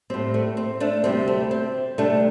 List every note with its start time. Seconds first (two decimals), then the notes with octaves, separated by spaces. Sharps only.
0.10 A2 G3 C4
0.34 A3
0.57 C4
0.80 A3 D4
1.04 D2 C3 G3 C4
1.28 A3
1.51 C4
1.98 D2 C3 G3 A3 D4